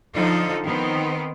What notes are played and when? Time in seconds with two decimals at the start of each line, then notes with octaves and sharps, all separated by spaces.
0.14 D3 F3 D#4 A4
0.63 D#3 B3 C4